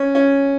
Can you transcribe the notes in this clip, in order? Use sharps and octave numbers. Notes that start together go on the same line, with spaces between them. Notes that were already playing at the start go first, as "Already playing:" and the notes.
Already playing: C#4
C#4